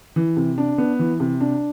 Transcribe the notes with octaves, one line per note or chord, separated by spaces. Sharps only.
E3
C3
D4
B3
E3
C3
D4